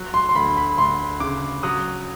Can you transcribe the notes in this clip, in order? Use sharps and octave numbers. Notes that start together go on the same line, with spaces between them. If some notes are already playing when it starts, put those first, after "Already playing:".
Already playing: F#3
C6
C6
D2 B5
B5
D2 C6
C#3 D6
F#3 D#6